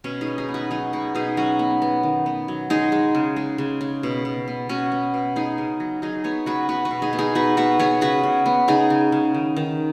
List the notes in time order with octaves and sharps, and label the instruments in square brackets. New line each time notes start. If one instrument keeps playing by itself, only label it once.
[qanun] B2 C#4
D#4 G#4
B3
D#4 G#4
B3
F#4 B4
F#3 D#4 G#4
B2 F#4 B4
B2 D#4 G#4
F#3 C#4 F#4
B3
B3
D#3
B3
F#3
G#3 D#4 G#4
G#3
C#3
G#3
C#3
C#3
B2
B2
B3
B2 C#4 F#4
B3
B2
B3 D#4 G#4
C#3
F#3
F#3 D#4 G#4
B3 G#4 C#5
C#3 F#4 B4
B3 F#4 B4
F#4 B4
B2
D#4 G#4
B3
D#4 G#4
B2 F#4 B4
B3 F#4 B4
B3 G#4 C#5
C#3 F#4 B4
C#3
B3
C#3 D#4 G#4
C#3
C#3
D#3
D#3